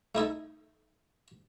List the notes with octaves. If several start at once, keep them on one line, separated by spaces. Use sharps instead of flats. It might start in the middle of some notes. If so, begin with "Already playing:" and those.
A3 D#4 E4 A4